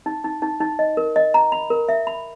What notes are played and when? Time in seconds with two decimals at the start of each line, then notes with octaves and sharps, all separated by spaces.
0.06 D#4
0.24 D#4
0.42 D#4
0.61 D#4
0.79 D#5
0.97 A#4
1.16 D#5
1.34 A#5
1.52 B5
1.70 A#4
1.89 E5
2.07 B5